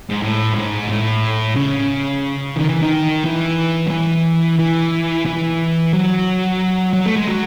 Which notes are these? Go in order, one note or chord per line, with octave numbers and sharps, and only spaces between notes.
G#2
A2
G#2
A2
C#3
D#3
E3
D#3
E3
F#3
E3
E3
E3
F#3
F#3
A3
G#3
F#3